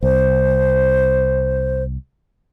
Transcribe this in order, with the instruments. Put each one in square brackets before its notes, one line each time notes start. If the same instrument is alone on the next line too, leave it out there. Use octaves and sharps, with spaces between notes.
[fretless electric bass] C2 [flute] C5